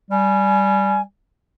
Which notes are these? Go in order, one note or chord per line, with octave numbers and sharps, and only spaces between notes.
G3 G#5